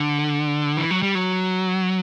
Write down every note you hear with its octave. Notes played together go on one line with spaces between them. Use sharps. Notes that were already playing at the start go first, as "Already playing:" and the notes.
Already playing: D3
E3
F#3
G3
F#3